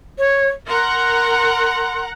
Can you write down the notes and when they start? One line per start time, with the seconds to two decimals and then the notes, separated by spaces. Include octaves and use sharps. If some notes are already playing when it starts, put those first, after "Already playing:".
0.18 C#5
0.68 A#4 F#5 A#5 C6